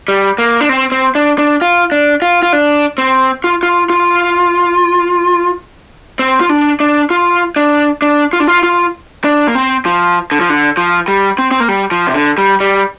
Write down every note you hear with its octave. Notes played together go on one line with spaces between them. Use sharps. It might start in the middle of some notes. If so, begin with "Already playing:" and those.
G3
A#3
D4
C4
C4
D4
D4
F4
D4
F4
F4
D4
C4
F4
F4
F4
C4
F4
D4
D4
F4
D4
D4
F4
D4
F4
F4
D4
A#3
C4
F3
D3
F3
D3
F3
G3
C4
C4
A#3
G3
F3
C3
D3
G3
G3